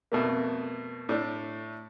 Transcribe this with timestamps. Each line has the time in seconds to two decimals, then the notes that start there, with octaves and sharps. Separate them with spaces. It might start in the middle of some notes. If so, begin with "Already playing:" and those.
0.12 F2 B2 A3 A#3
1.09 A2 A3 D4